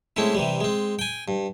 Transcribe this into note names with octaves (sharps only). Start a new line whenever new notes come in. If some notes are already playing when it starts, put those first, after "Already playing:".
G#3 A3 C4 C#4 E4
C3 E3 G3
G#3 C4
G5 G#5
G2